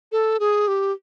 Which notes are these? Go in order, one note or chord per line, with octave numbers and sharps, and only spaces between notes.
A4
G#4
G4